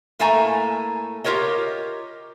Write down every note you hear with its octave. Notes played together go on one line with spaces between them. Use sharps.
A2 A3 A#3 A4 G#5 A#5
F4 G4 A#4 C#5 D#5